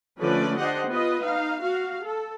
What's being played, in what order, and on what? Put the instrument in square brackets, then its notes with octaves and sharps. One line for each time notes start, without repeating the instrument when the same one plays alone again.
[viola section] D3 F3 A3 C#4 B4 D5
D4 G4 C5 D#5 F#5
B3 F4 B4 D#5
D#4 F5
F#4 F5
A4